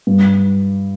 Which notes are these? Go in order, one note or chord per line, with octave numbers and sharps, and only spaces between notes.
G2